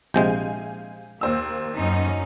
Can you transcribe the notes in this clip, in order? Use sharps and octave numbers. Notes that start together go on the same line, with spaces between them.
A#1 C3 G#3 F5 G#5 G6
D#2 A#3 C5 E6
F#2 C#4 D#4